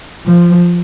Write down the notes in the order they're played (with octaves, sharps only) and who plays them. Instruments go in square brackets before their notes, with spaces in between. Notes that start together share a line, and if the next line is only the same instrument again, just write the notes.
[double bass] F3